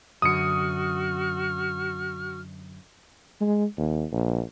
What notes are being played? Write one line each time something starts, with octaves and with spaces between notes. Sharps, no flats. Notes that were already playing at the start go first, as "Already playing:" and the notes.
F#2 D3 F#4 C#6 D#6 F6 C#7
G#3
D#2
A#1